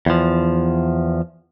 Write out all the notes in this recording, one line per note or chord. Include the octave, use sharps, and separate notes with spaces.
E2 F3